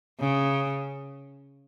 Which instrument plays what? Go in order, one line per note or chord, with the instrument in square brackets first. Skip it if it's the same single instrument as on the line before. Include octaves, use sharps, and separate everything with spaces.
[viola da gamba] C#3